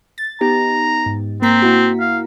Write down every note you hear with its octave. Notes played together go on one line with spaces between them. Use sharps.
A6
B3 D#4 G4 A#5
G#2
A#3 C4 A#5 B6
A#3 E4 F#4
F5